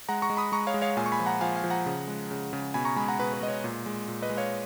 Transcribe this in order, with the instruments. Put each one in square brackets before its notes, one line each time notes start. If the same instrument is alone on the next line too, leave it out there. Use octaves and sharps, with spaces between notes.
[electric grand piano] G#3 F#5 A#5
A#5 C#6
G#3
B5 D#6
G#3 A#5 C#6
C#5 F5
G#3
C#5 F5
A#2 F5 G#5
C#6
G#5 B5
F3
F#5 A#5
F3 F5 G#5
F5 G#5
F3
F#5 A#5
C#3
G#3
C#3
C#3
B2 G#5 B5
A#5 C#6
G#3 G#5 B5
F#5 A#5
B2 B4
B4
G#3 D#5
C#5
A#2
G#3
A#2
B4 D#5
G#3
C#5 F5